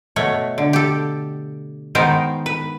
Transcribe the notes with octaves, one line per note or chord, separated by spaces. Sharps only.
B2 A3 C#5
D3
G4 A4
D#3 G#3 B3 D#4 A#4 C5
B4